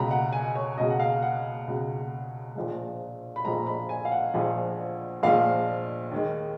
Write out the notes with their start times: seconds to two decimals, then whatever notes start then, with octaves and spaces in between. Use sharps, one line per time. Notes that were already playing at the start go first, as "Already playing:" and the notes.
Already playing: C#2 B2 G#3 A#5 B5
0.11 F#5
0.33 G#5
0.55 C#5
0.77 C#2 B2 G#3 D#5
0.90 F#5
1.00 F5
1.23 F#5
1.67 C#2 B2 G#3
2.55 A#1 A#2 F3 G#3
3.36 B5
3.45 A#1 A#2 F3 G#3 A#5
3.67 B5
3.89 G#5
4.05 F5
4.12 F#5
4.34 A#1 A#2 F3 G#3
5.23 A#1 A#2 F3 G#3 F5
6.12 D#2 D#3 G#3